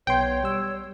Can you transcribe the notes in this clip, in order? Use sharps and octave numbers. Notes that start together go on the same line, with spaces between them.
B1 B3 C#5 G5 C6
G3 E6